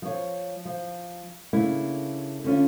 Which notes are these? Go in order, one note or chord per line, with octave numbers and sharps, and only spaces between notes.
F3 C#5
F3
C#3 A3 A#3 D4 E4
D3 C#4 F4